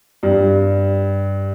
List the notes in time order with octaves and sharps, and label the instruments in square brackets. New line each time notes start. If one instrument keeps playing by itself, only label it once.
[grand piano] G2